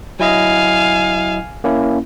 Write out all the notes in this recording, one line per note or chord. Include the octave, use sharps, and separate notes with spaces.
F#3 E4 D#5 F5 G#5
A#3 C#4 E4